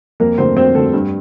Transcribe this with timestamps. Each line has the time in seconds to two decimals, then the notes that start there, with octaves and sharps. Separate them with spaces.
0.20 F2 A#3 A#4
0.38 D3 A3 C4 C5
0.57 F2 C4 C5
0.75 D3 A3 A4
0.93 G2